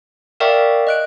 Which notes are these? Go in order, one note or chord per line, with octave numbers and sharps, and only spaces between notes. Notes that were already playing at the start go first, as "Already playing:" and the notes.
A#4 D5 E5 F5 G5 C#6
D#5 F#6 D7